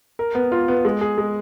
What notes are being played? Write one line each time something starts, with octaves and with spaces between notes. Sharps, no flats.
A#4
B3
F4
B3
G#3
G#4
G#3